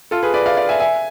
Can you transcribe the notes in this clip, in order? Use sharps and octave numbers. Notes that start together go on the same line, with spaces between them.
F4 A4
G#4 B4
B4 D5
D5 F5
D5 F5
E5 G#5
E5 G#5